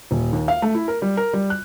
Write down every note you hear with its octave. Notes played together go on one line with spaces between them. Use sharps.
D#1
D#2
F5
A3
E4
A#4
G3
A#4
G3
F#6